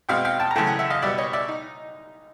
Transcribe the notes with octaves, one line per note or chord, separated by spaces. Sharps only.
B2 G#3 C4 F5 G5
F5 G5
G5 A5
A#5
F#2 C#3 E3 A3 G5 A5
F#5 G#5
E5 F#5
D#5 F5
B2 G3 B3 D5 E5
C#5 D#5
D5 E5
D#4